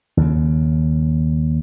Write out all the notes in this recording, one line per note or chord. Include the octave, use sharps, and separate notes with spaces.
D#2 C#3